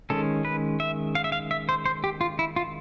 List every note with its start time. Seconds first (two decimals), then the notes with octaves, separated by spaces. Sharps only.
0.10 D#3 G#3 C#4 A4
0.45 B4
0.80 E5
1.15 F5
1.24 E5
1.32 F5
1.51 E5
1.69 C5
1.86 C5
2.04 G4
2.21 F4
2.39 E4
2.56 F4